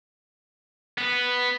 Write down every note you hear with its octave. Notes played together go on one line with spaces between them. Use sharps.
B3